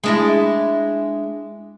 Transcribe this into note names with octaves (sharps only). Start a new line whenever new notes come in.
G#3 D4 E4